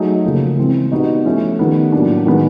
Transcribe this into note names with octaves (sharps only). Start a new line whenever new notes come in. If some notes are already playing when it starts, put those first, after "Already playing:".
Already playing: F#3 A3 D#4 G#4
C#3 F3 A#3
E3 G#3 C4
G3 B3 D#4 F#4
F3 A3 C#4 E4 A4
D#3 G3 B3
A2 F#3 A#3 D4
D#3 G#3 B3